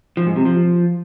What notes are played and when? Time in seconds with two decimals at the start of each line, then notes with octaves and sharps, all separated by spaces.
0.17 F3
0.27 G#2
0.36 C3
0.45 F3